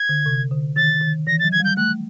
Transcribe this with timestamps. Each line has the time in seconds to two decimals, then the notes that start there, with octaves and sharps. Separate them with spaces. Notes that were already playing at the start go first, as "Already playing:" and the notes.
Already playing: G#6
0.09 D3
0.26 C3
0.51 D3
0.76 D#3 A6
1.01 D#3
1.27 E3 A#6
1.39 A6
1.44 F#3
1.52 G#6
1.60 G3 G6
1.77 A3 F#6